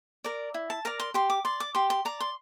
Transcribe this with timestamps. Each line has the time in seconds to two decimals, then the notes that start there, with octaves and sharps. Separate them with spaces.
0.24 A#4 D5
0.54 E4
0.70 A5
0.85 A#4 D5 A#5
1.00 C6
1.14 G4 C6
1.30 D6
1.45 D5 C6
1.60 D6
1.75 G4 C6
1.90 C6
2.05 D5 A#5
2.20 C6